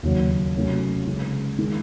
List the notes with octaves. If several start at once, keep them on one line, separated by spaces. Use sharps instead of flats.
D#2 C#3 F#3
C3 F#3 A3 C#4 F#4
C#3 G#3 C#4
D#3 G#3